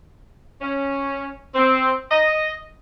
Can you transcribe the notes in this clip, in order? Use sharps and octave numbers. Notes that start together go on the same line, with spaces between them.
C#4
C4
D#5